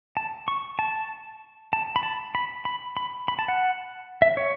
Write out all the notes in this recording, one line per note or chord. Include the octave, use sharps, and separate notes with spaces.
A5
C#6
A5
A5
B5
A5
B5
B5
B5
B5
A5
F#5
E5
C#5